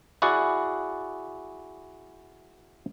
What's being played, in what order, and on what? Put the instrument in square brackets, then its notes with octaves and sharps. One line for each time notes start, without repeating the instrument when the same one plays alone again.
[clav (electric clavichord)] E4 F#4 G#4 D5 F#5